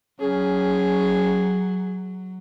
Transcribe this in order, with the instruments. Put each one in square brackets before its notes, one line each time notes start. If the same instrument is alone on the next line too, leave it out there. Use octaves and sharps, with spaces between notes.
[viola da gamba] F#3 [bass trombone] C#4 [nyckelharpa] G#4